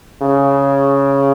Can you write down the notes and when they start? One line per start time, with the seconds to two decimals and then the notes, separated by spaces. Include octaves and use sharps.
0.22 C#3